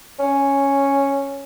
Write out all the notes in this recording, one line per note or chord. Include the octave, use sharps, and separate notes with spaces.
C#4